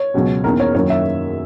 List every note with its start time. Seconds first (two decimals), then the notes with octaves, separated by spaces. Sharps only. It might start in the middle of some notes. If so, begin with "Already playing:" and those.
Already playing: C#5
0.14 C#2 B2 F#3 C#4
0.44 E2 D#3 A#3 C#4 A#4
0.60 C#5
0.75 F#2 D#3 F#3 A#3 C#5
0.90 E5